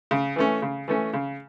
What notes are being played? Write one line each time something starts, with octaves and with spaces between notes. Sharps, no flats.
C#3
E3 A3 C#4
C#3
E3 A3 C#4
C#3